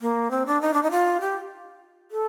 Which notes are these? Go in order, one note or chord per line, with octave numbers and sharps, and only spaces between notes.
A#3
C4
D4
D#4
D4
D#4
F4
G4
A4